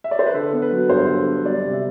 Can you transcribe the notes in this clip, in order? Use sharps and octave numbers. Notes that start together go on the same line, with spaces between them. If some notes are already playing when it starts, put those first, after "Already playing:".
E5
D5
C5
B4
D3 A4
B3
B4
F#3
G2 C5
D3
B3
G3 D5
C3
E5